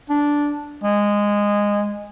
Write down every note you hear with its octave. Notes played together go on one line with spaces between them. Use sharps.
D4
G#3